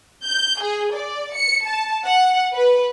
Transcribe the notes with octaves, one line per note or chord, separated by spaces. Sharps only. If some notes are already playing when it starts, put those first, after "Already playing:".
G6
G#4
D5
C#7
A5
F#5
B4